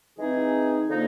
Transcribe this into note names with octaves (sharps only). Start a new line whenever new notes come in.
E3 G#3 C4 D#4 G#4
D3 F3 A#3 D#4